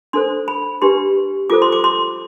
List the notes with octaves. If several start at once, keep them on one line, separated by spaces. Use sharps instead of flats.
D4 A4 C5 C6
B5
D4 G4 B4 C6
F4 A4 C5 D6
C6
D6
C6